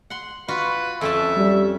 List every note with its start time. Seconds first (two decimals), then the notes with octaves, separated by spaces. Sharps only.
0.10 F#5 C6
0.48 F4 F#4 B4
1.01 F2 C#4 E5 A5
1.36 G3